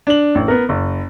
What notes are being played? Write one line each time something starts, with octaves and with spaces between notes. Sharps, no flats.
D4 F#7
A1
B3 A#4
F#1